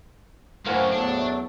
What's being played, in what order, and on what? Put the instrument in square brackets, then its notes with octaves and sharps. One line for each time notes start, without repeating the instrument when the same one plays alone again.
[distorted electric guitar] F#2 A#3 [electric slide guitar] A2 [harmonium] E3 F#4 A#4 [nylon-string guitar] C5 F5
[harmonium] E2 F#3 A3 [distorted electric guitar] D4